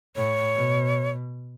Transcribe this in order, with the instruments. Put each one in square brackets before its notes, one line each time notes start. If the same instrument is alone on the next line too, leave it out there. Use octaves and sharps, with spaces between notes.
[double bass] A2 [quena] C#5
[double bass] B2